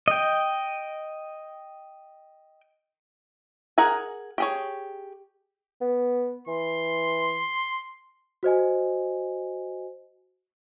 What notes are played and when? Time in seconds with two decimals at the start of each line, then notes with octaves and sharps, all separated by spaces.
0.08 D#5 G5
3.78 G#4 A#4 F#5 G#5
4.38 G4 G#4 C#5
5.81 B3
6.47 E3 C6
8.43 F#4 C5 D#5 G#5